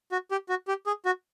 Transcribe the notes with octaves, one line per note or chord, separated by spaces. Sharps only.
F#4
G4
F#4
G4
G#4
F#4